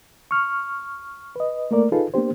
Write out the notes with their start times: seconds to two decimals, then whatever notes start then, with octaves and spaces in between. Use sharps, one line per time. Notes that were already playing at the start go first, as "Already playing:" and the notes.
0.31 C#6 F6
1.36 B4 D#5
1.71 A3 A#3 A#4 D5
1.92 D#4 F4 G#4 A4 B4
2.14 A#3 B3 D4 G4 C5